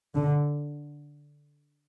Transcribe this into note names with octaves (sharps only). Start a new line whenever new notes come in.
D3